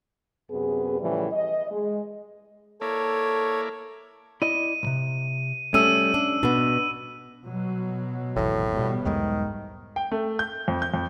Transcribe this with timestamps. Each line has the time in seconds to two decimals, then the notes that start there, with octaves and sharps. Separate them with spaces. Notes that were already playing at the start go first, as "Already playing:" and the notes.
0.50 F#2 C3 B3 G#4
1.00 A2 C#3 E3 F3 G3
1.32 D#5
1.71 G#3
2.81 A#3 E4 A4 C#5 D5
4.42 E4 D5 D#5 D#7
4.83 B1 C3
5.74 G3 A3 C#4 E6 D#7
6.14 D4
6.43 B2 B3 D4
7.43 B2 F#3
8.36 G#1 E2 A2
8.73 B2 G3 B3
9.05 B1 E2 G#2 D#3 G#3
9.96 G5
10.12 A3
10.39 G6
10.68 F2
10.82 G6
10.94 F2